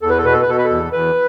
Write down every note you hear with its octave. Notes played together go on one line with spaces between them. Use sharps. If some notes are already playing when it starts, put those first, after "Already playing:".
E2 A4
B4
A4
B2 B4
A4
B4
B2 A4
B4
A4
E2
E2 B4